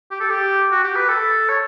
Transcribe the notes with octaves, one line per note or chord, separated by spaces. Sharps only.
G4
A4
G4
F#4
G4
B4
A4
C#5